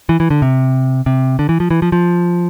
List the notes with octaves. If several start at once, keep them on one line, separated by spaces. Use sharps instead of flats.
E3
E3
D3
C3
C3
D3
E3
F3
E3
F3
F3